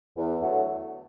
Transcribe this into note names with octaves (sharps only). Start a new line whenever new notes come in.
E2
D3 F#3 A3 F#4